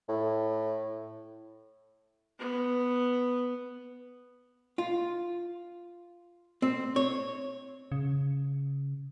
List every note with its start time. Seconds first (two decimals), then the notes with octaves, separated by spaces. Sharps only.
0.09 A2
2.39 B3
4.78 F4
6.62 C4
6.96 C#5
7.92 C#3